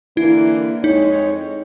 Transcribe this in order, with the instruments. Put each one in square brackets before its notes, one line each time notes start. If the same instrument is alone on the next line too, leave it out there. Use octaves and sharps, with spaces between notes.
[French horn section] D3 E3 A#3 [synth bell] E4
[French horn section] F2 G#3 C#5 [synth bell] D#4